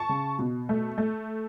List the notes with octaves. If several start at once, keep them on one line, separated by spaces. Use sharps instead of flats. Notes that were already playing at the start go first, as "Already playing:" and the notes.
Already playing: A5 C#6
C#3
B2
A3
A3